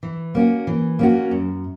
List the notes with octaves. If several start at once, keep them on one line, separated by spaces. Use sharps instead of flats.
E3
A#3 C#4 F#4
E3
A#3 C#4 F#4
F#2